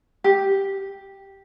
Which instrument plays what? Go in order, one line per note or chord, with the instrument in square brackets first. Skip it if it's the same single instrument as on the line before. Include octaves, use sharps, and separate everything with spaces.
[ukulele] G4